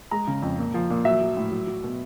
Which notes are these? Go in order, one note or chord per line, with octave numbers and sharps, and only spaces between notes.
G#3 A#5
C#3
F2
A#2
F3
A#2
F#3 E5
F#3
A2
F#3
F#3
B2